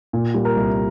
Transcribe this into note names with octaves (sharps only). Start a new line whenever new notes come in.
A#2
G3
A#4
C2